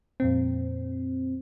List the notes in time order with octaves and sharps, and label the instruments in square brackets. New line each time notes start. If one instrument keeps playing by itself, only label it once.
[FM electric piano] F2 A#2 C4